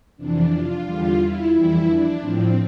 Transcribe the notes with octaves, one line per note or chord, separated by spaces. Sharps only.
F2 C3 E3 D4
F4
E2 D3 G3 F4
E4
F2 E3 G3 E4
D4
A2 F3 C4